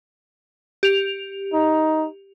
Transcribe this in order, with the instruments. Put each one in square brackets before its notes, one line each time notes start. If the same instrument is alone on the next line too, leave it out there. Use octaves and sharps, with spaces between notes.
[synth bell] G4 F7
[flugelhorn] D#4